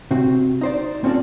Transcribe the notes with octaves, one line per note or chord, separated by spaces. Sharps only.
C3 C4 F#4
D#4 C5 D5
C4 C#4 F4 A4 D5